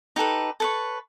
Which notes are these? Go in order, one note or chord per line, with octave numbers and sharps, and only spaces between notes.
D#4 G4 A4 B4
A4 B4 C#5